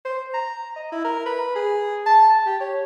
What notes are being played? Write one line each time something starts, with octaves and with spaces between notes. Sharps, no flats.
C5
A#5
D#5
E4
A#4
B4
G#4
A5
G4
C#5